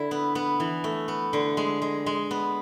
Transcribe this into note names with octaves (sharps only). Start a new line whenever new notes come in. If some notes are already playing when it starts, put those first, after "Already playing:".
Already playing: D3 E4
B3
B3
E3
A3
B3
D3
G#3
G#3
G#3
B3